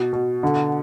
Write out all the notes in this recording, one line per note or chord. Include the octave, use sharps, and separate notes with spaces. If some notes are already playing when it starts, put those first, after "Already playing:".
Already playing: B2
B2
D3